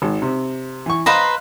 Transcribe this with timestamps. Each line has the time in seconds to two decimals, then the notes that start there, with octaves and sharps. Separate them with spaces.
0.02 G#1
0.22 C3
0.86 E3 C#6
1.06 B4 C5 D#5 F5 A#5 B5